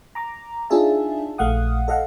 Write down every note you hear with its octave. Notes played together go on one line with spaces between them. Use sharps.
A#5 D6
D4 D#4 F4 G#4 E5 A5
A#1 A3 F5 F#5 D#6
A4 D#5 F5 F#5